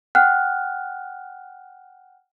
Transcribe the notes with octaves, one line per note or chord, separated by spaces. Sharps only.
F#5 G5 F6 F#6